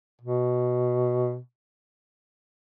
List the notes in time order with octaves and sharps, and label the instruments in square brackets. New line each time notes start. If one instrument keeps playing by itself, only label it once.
[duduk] B2